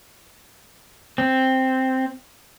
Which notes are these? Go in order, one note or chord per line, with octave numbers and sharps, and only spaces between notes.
C4